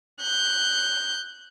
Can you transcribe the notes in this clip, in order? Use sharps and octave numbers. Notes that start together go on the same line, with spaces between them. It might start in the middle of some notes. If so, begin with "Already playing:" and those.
F#6 G6